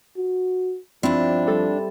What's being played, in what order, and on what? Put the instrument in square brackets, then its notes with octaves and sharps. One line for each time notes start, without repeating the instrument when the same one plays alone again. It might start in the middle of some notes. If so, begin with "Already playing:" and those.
[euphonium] F#4
[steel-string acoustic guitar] G2 D4 [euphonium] F3 [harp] C4 E4
[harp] G3 A4